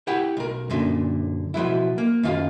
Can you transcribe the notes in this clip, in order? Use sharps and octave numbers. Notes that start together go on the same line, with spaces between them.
E4 G4 F#5 G5
B1 A#4
F#2 A#2 D3
B2 F3 F#3 E4
A#3
F#2 D#3 F4 F5